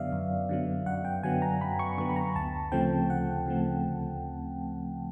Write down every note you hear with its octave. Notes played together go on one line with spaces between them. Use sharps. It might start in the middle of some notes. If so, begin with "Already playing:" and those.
Already playing: F#2 D3 F#3 B3 D5 E5 F5
F#2
D3 F#3 B3
F#2 F#5
G5
D3 F#3 B3 G#5
A#5
F#2 B5
C#6
D3 F#3 B3 C#6
B5
A#5
D2 A5
C#3 F3 A3 C4 G5
D2 F#5
C#3 F3 A3 C4
D2